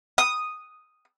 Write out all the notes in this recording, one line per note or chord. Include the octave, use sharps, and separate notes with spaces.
D#6